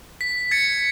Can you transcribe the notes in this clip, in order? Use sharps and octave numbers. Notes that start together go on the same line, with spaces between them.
B6
G#6 A6 B6 C#7